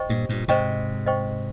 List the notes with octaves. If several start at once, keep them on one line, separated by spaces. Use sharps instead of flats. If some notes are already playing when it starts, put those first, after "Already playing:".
Already playing: C5 D#5 G5 C#6
G2 A#2
G2 A#2
G#2 C3 C5 D#5 G5 C#6
C5 D#5 G5 C#6